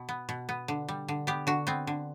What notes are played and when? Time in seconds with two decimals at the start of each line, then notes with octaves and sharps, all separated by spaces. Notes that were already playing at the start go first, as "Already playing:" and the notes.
Already playing: B2
0.09 B3
0.29 B2
0.49 B3
0.68 D3
0.89 G3
1.08 D3
1.27 B3 G4
1.47 D3 F#4
1.67 B3 C4
1.87 D3